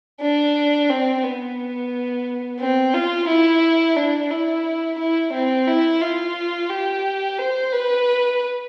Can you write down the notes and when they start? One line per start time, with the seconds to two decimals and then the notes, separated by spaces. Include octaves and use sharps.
0.21 D4
0.89 C4
1.23 B3
2.60 C4
2.94 F4
3.28 E4
3.96 D4
4.31 E4
4.99 E4
5.33 C4
5.67 E4
6.01 F4
6.70 G4
7.38 C5
7.73 B4